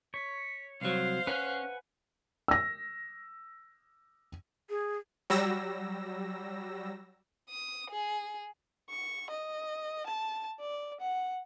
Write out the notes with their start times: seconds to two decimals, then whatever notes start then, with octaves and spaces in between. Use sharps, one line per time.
0.14 C#5 B6
0.81 C2 F#3 C5 F5 C7
1.27 C#4 B4 F#5 G#5 F#6
2.48 E6 A#6
4.70 G#4
5.30 F#3 G3 E6 A#6
7.50 D#6
7.91 G#4
8.90 C#6
9.30 D#5
10.06 A5
10.59 D5
11.01 F#5